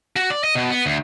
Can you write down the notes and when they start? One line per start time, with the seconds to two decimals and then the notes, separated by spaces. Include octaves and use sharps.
0.16 F#4
0.30 D5
0.44 D#5
0.55 B2
0.71 B3
0.86 D2